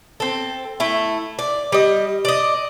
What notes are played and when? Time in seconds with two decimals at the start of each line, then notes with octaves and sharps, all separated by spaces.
0.20 C4 A4
0.80 A3 E4
1.39 D5
1.72 G3 D#5
2.25 D5 D#5